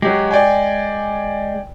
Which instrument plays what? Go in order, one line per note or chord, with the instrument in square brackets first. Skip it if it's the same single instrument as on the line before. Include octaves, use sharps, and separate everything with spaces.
[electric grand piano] F#3 G4 [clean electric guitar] G#3
[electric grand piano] D5 G5 G#5